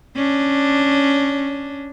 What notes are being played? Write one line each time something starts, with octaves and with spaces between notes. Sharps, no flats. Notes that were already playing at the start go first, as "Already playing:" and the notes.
C#4 D4